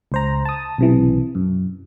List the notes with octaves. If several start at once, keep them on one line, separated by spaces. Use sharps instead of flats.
C#2 C5 A#5
A5 D#6
B1 C3 E3
F#2